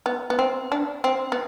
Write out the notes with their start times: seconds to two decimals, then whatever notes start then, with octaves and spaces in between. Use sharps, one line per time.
0.06 B3
0.30 B3
0.39 C4
0.72 D4
1.04 C4
1.32 B3